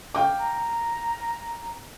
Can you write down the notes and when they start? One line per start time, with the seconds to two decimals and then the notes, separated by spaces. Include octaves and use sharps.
0.15 F5 G5 D6
0.39 A#5